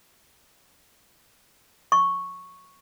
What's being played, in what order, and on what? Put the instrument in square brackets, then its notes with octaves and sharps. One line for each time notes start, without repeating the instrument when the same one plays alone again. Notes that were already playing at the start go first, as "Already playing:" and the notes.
[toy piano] C#6